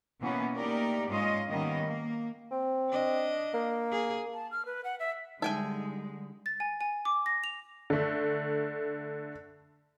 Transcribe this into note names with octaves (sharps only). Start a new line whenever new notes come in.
B2 E3 A#3 B3 C#4
A3 A#3 D#4 G4 A#4 D5
G#2 G#3 C#4 F4 D#5 F5
D#3 G3 A#3 B3 C#4 D#5
A#3
C4
D4 D#5
A#3
G#4
A5
F6
B4
F#5
E5
D3 G3 G#3 D#4 E5 G5 G#5
A6
G#5
G#5
D6
A#6
F7
D3 A3